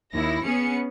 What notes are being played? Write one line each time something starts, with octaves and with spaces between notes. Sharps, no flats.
D#2 E4 A#6
B3 C#4 G#4 C#7